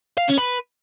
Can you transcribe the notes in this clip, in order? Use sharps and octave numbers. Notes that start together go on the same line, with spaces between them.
F5
C#4
B4